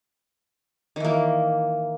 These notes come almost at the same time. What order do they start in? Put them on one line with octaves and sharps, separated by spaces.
D#3 E3 A#3